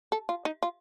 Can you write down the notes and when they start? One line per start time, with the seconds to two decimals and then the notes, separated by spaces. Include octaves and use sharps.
0.12 A4
0.29 F4
0.45 D#4
0.63 F4